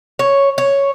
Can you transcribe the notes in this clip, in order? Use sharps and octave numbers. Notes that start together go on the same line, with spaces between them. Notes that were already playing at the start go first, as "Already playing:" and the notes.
C#5
C#5